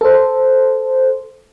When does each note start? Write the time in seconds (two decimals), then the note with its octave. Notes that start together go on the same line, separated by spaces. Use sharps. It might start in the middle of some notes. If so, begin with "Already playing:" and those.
0.01 A4 C5